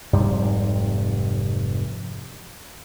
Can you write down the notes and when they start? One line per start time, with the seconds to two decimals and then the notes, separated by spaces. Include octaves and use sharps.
0.13 F1 G#2 C3 G3